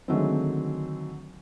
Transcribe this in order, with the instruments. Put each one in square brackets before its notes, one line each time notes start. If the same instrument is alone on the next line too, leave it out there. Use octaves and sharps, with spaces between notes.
[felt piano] D3 D#3 F#3 G#3 A3 C4